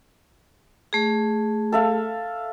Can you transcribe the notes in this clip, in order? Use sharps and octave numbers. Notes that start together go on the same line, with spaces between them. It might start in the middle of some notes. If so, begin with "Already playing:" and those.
A3 G#4
A4 E5 F5